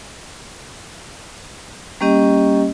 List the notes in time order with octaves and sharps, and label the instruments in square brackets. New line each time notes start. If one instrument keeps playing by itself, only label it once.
[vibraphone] G3 A#3 C#4 G4 D#5